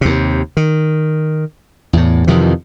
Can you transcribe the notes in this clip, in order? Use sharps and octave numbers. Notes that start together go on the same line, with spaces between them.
D#2 C3
D#3
E2 A2
F2 C3 D#3 E3